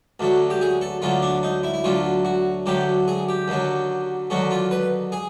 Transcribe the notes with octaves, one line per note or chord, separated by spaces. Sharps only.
D2 D3 F#3
G4
G#4
A4
D2 D3 F#3 F4
D4
D#4
E4
E4
D2 D3 F#3 F4
F#4
D2 D3 F#3 G4
G#4
G4
D#2 D3 F#3
D#2 D3 F#3 F#4
F4
B4
G#4